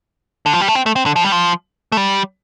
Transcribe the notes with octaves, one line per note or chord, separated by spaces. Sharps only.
D3
F3
G3
A3
C4
A3
C4
D3
F3
G3
F3
A3
G3